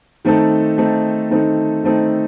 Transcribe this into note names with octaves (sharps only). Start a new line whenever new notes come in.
D#3 A3 C4 D#4 A4
D#3 A3 C4 D#4 A4
D#3 A3 C4 D#4 A4
D#3 A3 C4 D#4 A4